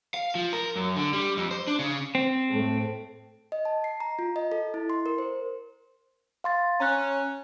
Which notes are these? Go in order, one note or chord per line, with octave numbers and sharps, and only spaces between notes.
F5
F3
A#4
F#2
D3
G3
F2
C5
D4
C#3
C4
A2 A3
D#5
A5
C7
A#5
F4
D#5
A4
E4
C6
A#4
C5
F5 C6 A6
C#4 A#5 F#6